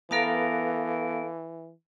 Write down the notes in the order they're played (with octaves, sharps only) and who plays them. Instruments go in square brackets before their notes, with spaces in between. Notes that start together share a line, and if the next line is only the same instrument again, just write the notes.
[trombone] E3 [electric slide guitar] B3 A#4 [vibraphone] A4 F5 A5